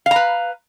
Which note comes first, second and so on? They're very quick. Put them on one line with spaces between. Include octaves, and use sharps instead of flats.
F5 A#5 B4